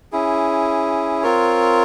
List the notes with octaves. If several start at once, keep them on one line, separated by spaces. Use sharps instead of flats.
C#4 E4 G#4
C4 F4 A#4 C#5